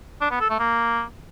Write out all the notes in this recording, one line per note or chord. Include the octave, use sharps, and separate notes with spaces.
D4
B3
A4
A3
A#3